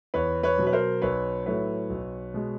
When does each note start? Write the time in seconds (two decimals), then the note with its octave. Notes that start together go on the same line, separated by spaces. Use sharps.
0.14 E2 B4 C#5
0.43 B4 C#5
0.58 B2 F#3
0.67 B4
0.73 A#4 C5
1.01 B1 B4 C#5
1.46 A2 F#3 A3 B4 C#5
1.90 B1
2.34 B2 G#3